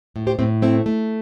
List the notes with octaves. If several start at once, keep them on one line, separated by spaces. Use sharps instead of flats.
A2
G4 C5
A2 C4
A3 C4 E4
A3